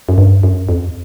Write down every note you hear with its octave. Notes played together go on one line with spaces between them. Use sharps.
F#2
G2
F#2
F2